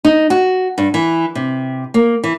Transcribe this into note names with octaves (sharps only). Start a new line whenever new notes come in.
D#4
F#4
G2
E3
C3
A#3
E3